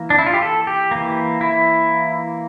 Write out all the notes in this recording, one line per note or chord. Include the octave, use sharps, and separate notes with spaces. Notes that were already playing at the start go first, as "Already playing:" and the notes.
Already playing: E3 A#3
D4
E4
F4
G4
A4
G4
E3 A#3
E4